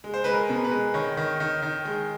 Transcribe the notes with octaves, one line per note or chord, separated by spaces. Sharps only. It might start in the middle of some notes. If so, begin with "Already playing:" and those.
G#3
C5
G#3 B4
A#4
B2
B4
G#3
D#3 C#5
D#3
D#3
D#3
G#3